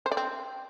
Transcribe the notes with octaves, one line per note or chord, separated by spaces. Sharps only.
C5
D5
C4